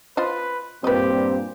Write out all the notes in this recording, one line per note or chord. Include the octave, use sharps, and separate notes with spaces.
F4 B4 C5 D#5
G2 A#2 G3 C4 G4 B4 D#5